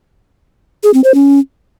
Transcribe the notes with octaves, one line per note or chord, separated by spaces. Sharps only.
G#4
C4
C5
C#4